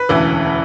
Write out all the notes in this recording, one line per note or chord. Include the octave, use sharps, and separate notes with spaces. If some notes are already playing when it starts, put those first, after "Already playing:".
Already playing: B4
E1 D2 C#3 E3